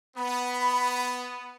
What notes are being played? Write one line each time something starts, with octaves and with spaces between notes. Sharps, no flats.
B3 B5